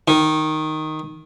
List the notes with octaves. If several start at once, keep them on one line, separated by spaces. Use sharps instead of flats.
D#3